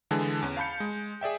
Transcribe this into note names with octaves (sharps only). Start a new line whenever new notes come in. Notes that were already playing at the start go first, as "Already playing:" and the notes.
D3 E3 G#3 G#4 G#5 A5
E2 C#4
F5 A5 B5 G6 C#7
G#3
G#4 D5 E5 G5